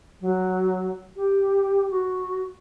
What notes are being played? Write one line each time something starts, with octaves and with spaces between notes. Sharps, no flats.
F#3
G4
F#4